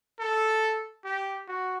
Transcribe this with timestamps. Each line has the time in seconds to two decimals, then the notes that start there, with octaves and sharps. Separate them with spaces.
0.20 A4
1.04 G4
1.48 F#4